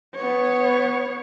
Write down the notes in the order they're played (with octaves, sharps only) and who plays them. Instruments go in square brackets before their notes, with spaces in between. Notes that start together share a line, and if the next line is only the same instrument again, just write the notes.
[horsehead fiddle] B3 C#5